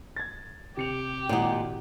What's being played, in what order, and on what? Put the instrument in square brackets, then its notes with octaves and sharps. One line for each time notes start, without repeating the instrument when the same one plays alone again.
[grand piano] G#6 A6
[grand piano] C3 C#7 F7 [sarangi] G4
[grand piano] G#1 E4 F#5 [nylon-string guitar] A#2 D#4